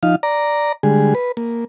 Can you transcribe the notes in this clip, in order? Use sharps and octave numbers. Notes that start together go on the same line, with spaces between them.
F3 D#4 F5
D5 A#5
D3 G3 G#3 G#4
B4
A#3